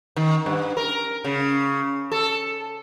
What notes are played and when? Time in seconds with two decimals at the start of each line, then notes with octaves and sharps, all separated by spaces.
0.16 D#3
0.46 G2
0.77 A#4
1.24 C#3
2.12 A4